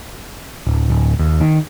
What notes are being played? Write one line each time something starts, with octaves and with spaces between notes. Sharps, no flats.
D1
D1
D#2
D#3